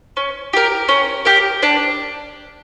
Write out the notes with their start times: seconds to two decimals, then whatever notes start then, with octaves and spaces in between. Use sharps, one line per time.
0.17 C#4
0.53 G4 A#4
0.89 C#4
1.25 G4 A#4
1.63 D4